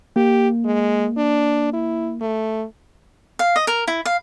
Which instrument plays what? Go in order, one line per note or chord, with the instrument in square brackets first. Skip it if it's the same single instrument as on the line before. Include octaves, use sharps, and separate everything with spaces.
[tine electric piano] A#3 [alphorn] G4
[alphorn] G#3
D4
E4
A3
[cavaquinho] F5
D#5
A#4
E4
F5